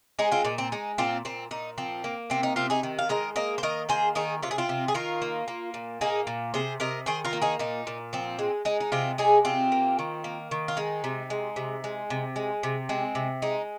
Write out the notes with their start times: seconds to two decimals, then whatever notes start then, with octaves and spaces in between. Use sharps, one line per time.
0.19 G#3 D#4 G#4
0.32 C4 F4
0.45 A#2 D#4
0.58 C4
0.72 G#3 D#4
0.98 A#2 C4 F4
1.25 A#2 C4
1.51 A#2 D#4
1.78 F3 C4
2.04 A#3
2.30 C3 C4
2.43 D#4
2.56 C3 C4 F4
2.70 D#4 G#4
2.83 D#3
2.99 F5
3.09 G#3 A#4 D#5
3.36 A#3 A#4 D#5
3.58 C5
3.63 D#3 A#4 D#5
3.89 A#3 G#4 C5
4.15 D#3 D#4 G#4
4.43 C3 F4
4.51 G#4
4.58 C4 F4
4.69 C3
4.88 G#4
4.94 D#3 F4 A#4
5.22 A#3
5.48 A#3
5.74 A#2
6.01 A#3 D#4 G#4
6.27 A#2
6.54 C3 G#4 C5
6.80 C3 A#4 D#5
7.06 D#3 G#4 C5
7.25 F4 A#4
7.33 A#3
7.42 D#4 G#4
7.59 A#2 D#4
7.87 A#2
8.13 F3 C4
8.39 G#3
8.65 G#3 D#4
8.80 D#4
8.92 C3 C4 F4
9.18 G#3 D#4 G#4
9.45 C3 C4 F4
9.72 A#3
9.99 D#3
10.24 A#3
10.51 D#3
10.68 F4
10.77 G#3 D#4
11.04 C3
11.30 G#3
11.56 C3
11.84 G#3
12.10 C3
12.36 G#3
12.63 C3
12.89 G#3 C4
13.15 C3
13.42 G#3 D#4